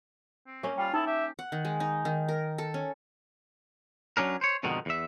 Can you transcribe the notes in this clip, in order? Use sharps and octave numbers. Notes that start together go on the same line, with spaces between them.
C4
A#3 C#4
G3 F4 G5
D#4 E4 A4 D#6
G4 E5
F#5
D#3
G#3
D#4
D#3
A#4
A4
C#4
F#3 C#4 D4 A#4
C5 C#5
F2 G#2 B2 D3 D#3
E2 E5